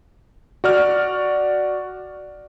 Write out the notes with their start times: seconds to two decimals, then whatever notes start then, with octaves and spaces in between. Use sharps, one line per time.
0.64 F#4 D5 F6